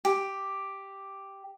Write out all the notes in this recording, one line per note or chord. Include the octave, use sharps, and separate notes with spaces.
G4